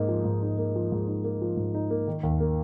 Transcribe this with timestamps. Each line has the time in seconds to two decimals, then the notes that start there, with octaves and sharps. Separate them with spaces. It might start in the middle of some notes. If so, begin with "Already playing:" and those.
Already playing: G#2 A#3 D#4
0.08 F3
0.25 G#2
0.42 D#4
0.58 A#3
0.76 F3
0.92 G#2
1.08 D#4
1.24 A#3
1.42 F3
1.57 G#2
1.74 D#4
1.91 A#3
2.07 D#3
2.23 D#2
2.40 A#3